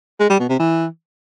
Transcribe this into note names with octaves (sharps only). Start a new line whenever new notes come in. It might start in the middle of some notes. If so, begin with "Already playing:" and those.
G#3
G3
B2
C3
E3